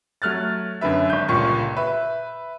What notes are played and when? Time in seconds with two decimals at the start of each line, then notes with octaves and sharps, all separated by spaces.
0.22 F#3 A3 F6 F#6 A6
0.81 F#2 D3 B4 E5
1.10 G#1 G6
1.29 G1 C#2 A#2 C#6
1.77 B4 E5